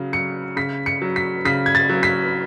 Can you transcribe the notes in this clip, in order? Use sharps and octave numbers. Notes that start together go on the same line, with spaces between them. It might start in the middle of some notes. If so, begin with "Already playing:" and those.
Already playing: C#3 F#3
F#3 C#7
C#3 B6
C#7
F#3
B6
C#3 B6
G#6
A6
F#3
B6